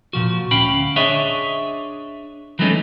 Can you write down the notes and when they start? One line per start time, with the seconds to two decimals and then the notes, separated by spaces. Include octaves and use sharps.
0.13 A#2 F3 F#4
0.51 D2 C#4 F5 G5 B5
0.96 D4 G#4 C#5 D#5 E5
2.59 E3 F#3 G#3 A3 C#4 D#4